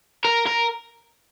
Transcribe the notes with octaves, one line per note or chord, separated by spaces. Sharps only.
A#4
A#4